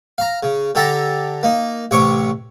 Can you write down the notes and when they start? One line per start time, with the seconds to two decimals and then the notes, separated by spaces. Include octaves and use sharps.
0.18 F5 A#5
0.43 C#3
0.75 D3 G4 A4 E5 A5 A#5
1.43 A#3 D#4
1.91 A1 C3 C#5 C#6 D6